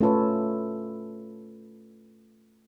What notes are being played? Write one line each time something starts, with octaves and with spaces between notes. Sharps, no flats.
A3 C#4 F4 A4 B4 C#5